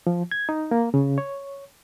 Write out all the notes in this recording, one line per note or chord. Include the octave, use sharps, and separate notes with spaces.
F3
G#6
D#4
A#3
C#3
C#5